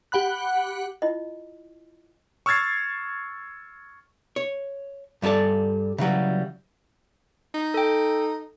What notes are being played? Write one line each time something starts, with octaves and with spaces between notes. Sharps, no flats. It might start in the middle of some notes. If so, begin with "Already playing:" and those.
G4 F#5 B5 F#6
E4 F4 D#5
C#6 E6 F6 G#6 A6 C7
C#5
G2 G3 E4 A4 D5
C#3 E3 F#3 G3
D#4
A4 G5